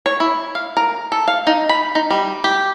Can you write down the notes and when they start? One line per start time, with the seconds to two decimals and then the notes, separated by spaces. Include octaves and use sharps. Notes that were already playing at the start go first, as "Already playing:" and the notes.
0.06 C#5
0.20 E4
0.55 F5
0.77 A#4
1.12 A4
1.28 F5
1.47 D#4
1.69 B5
1.95 D#4
2.10 G3
2.44 G4